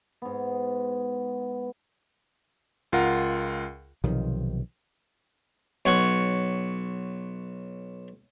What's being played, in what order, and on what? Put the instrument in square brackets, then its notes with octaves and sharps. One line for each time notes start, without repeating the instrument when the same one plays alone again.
[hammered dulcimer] G#2 B3
[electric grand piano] C#2 F4 A#4 F#5
[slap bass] B1 C3 D#3 F3
[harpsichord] B1 C#5 F#5 C#6